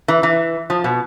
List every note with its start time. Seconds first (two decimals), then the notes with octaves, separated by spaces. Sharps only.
0.08 E3
0.23 E3
0.70 F3
0.84 B2